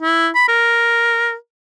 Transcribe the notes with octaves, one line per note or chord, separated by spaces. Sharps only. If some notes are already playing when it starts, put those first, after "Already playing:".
E4
B5
A#4